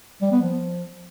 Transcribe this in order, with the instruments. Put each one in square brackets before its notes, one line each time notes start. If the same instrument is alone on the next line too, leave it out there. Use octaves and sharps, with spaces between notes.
[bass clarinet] G3
B3
F3